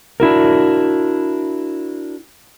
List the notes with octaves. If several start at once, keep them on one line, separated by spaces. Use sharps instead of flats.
D4 E4 F#4 A#4